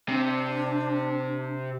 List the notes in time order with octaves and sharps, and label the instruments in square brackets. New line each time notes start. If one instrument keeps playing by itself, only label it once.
[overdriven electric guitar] C3 [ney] D4